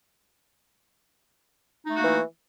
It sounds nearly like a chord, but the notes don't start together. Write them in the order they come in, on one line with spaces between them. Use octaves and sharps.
D#4 A3 F#4 A#3 E3